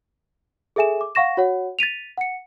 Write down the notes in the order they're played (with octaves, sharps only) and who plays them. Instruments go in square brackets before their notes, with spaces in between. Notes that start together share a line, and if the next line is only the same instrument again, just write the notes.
[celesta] G#4 A4 E5 G#5 E7
D6
F5 F#5 C#6 A#6 E7
F#4 C#5 F#5
A6 B6 D#7 F7
F#5 C#7